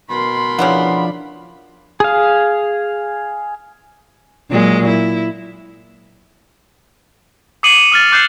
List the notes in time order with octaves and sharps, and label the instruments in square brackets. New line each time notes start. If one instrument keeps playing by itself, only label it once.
[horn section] B2 C6 [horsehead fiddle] A#4 B5
[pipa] C#3 E3 B3 [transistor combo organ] F3 D4
[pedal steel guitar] G#4 F5
[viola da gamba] A#2 F#3 G#3
E4
[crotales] D6 D#6 C7 C#7 D#7 F#7
D#6 F6 A6
D6 F#6 G6 C7 D#7 E7